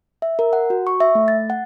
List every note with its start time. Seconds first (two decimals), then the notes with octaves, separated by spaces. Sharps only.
0.22 E5
0.39 A#4
0.53 F#5
0.70 F#4
0.87 C#6
1.00 E5
1.15 A3
1.28 A6
1.50 F#5